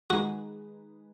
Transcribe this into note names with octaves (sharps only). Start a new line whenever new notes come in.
D#3 G#3 D#4 F#4 G#4 B4